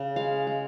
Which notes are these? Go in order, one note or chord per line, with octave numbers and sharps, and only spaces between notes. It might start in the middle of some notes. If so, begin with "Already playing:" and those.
Already playing: C#3
G#3 F5
G#3